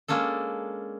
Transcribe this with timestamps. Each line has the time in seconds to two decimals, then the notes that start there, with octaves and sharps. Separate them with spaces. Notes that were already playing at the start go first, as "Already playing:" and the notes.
0.08 G#3 A#3 C#4 D4 A4